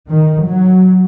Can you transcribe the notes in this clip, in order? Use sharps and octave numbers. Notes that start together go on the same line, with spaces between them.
D#3
F#3